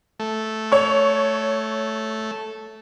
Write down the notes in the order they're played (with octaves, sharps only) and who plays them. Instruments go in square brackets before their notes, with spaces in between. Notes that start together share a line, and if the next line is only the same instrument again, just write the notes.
[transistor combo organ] A3
[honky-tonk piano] C#5 C#6